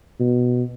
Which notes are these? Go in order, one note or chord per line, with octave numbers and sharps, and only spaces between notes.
B2